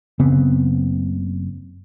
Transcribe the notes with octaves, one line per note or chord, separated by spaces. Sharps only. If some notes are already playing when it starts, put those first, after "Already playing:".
F#1 C#3 B3 C4